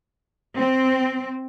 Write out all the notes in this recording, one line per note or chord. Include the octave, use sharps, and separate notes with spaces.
C4